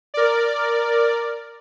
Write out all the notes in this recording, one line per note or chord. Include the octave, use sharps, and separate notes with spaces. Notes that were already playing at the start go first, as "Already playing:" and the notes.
A#4 D5